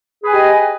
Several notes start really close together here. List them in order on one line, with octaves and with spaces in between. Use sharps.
G#4 B4 G#5 G4 D#5